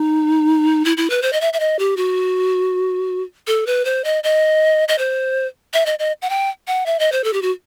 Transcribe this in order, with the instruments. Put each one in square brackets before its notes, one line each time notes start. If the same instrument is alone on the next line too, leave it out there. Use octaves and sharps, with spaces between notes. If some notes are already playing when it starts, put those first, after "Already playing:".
Already playing: [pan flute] D#4
E4
E4
B4
C5
D#5
E5
E5
D#5
G4
F#4
A4
B4
C5
D#5
D#5
D#5
C5
E5
D#5
D#5
F#5
G5
F#5
E5
D#5
C5
A4
G4
F#4